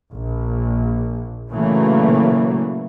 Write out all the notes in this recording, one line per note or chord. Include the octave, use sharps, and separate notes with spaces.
A#1
A#2 C#3 E3 F#3 A3 A#3